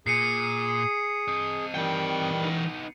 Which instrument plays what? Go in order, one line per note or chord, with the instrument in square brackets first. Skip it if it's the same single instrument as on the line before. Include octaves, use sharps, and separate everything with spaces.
[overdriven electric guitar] A#2 [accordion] G#4 D#6 [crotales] C7 C#7 D#7
[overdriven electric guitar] C4 D#5
[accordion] D#3 G3 [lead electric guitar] E3 G5
[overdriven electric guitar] B3 D#4